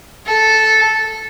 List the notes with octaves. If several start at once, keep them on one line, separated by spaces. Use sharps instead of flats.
A4